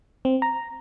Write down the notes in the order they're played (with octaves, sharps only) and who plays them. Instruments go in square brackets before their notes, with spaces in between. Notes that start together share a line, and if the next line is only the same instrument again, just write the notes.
[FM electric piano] C4
A#5